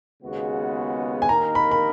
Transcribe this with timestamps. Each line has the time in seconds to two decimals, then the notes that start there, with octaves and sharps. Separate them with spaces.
0.22 D#2 C#3 G#3 B3 F#4
1.22 G#5
1.29 D#2 D#3 A#3 D#4 A#4 A#5
1.55 B5
1.71 B5